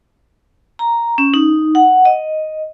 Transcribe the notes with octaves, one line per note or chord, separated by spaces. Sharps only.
A#5
C#4
D#4
F#5
D#5